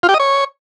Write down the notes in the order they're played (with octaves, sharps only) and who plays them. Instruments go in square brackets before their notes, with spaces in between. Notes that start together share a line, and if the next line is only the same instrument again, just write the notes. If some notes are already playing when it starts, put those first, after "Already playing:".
[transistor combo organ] F4
G4
D#5
C#5